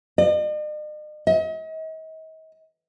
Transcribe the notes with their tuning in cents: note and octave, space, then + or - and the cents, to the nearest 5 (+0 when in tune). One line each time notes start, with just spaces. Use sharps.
D#5 -45
D#5 +40